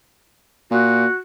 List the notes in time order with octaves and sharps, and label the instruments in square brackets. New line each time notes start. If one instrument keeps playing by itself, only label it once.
[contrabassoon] A#2 [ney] F#4